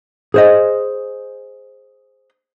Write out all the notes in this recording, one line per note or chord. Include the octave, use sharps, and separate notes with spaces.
G#4 C5 D#5